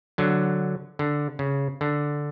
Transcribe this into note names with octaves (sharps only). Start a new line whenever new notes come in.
D3 F#3
D3
C#3
D3